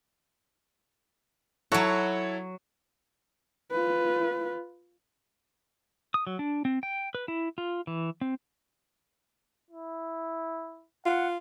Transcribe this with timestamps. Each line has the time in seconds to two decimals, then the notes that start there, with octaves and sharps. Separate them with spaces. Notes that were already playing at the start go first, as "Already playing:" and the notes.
1.72 F#3 E4 F#4 A4 C#5
3.71 F4 B4
6.14 D#6
6.27 F#3
6.39 D4
6.65 C4
6.83 G5
7.15 B4
7.28 E4
7.58 F4
7.87 E3
8.21 C4
9.71 E4
11.06 F4 F#5